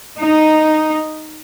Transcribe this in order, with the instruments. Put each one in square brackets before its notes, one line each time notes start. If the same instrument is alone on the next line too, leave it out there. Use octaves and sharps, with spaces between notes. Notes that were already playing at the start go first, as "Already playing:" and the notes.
[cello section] D#4